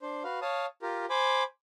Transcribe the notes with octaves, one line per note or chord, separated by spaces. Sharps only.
D4 C5
F#4 B4 F5
C#5 F5 A5 D#6
F4 G4 A#4
C5 G#5 B5 D6